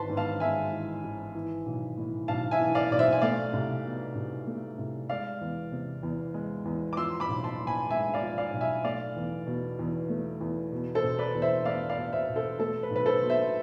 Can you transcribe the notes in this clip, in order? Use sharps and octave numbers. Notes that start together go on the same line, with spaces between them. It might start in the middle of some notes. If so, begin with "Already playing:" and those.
Already playing: G#1 E3 B4 A5 C6
G#2
F5 A5
G#3 E5 G#5
E3
G#1
E3
B1
A2
B1 F5 A5
E5 G#5
E3
D5 F5
B1 D5
C5 E5
G#5
A3 D5 F5
C2
B2
C2
A3
C2
G#3 D5 F5
E2
C3
E2
G#3
E2
D6
F3 C6 E6
B5 D6
B1
A5 C6
A2
G#5 B5
G#3 E5 G#5
D5 F5
F3
D5 F5
B1
E5 G#5
A3 D5 F5
E2
B2
E2
A3
E2
B2
A4 C5
E1
B4 D5
E2
C5 E5
A3 D5 F5
D5 F5
B2
C5 E5
E1
A4 C5
A3 A4
B4
B1
B4
A4 C5
B2
C5 E5